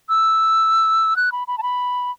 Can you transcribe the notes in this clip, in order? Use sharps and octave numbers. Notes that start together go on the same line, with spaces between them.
E6
F#6
B5
B5
A5
B5